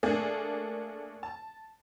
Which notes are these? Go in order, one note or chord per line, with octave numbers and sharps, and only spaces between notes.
A3 A#3 D4 G#4
A5